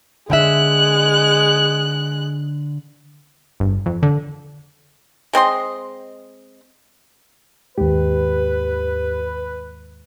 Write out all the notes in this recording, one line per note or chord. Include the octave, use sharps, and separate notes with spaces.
D3 G#3 E5 F#6
G1
F2
D3
G#3 C4 D#5 C6
D#2 G#2 G4 B4